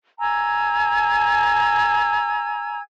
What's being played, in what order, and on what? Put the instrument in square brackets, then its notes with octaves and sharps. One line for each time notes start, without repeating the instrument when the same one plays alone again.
[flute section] G#5 A#5 E6 G#6